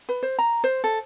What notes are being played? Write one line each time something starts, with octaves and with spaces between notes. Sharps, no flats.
B4
C5
A#5
C5
A4